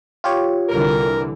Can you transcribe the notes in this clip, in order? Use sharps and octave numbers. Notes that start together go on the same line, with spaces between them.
F4 G4 C#5
C2 D3 E3 A#4